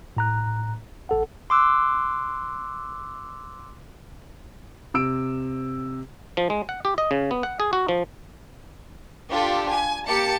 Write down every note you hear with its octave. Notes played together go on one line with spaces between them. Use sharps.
A2 A#5 F#6
A1 A4 F#5
C6 D6 E6 F#6
C3 E6 D7
F3
G#3
F#5
G4
D#5
C#3
B3
F#5
G#4
F#4
F3
D4 F4 G4 A4
G#5
A#3 G4 A5 C#7